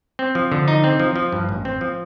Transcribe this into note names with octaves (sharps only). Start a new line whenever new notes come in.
C4
F3
D3
D#4
C4
F3
F3
G2
A1
C4
F3